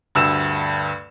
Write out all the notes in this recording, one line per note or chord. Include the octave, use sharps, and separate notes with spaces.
D2 G2 E6 E7